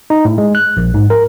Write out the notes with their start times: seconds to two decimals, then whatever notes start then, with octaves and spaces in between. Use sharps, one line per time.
0.10 D#4
0.25 A2
0.38 G#3
0.55 F#6
0.77 A#1
0.94 G#2
1.10 A#4